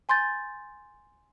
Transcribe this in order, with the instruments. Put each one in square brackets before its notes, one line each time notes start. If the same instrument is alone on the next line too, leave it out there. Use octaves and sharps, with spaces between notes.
[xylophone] G#5 C6 G6 A6